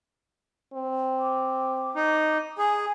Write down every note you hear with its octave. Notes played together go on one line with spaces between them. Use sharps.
C4
D6
D#4
G#4 G#5